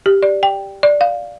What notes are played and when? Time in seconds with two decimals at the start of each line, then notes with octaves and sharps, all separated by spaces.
0.06 G4
0.23 D5
0.43 G5
0.83 D5
1.01 F5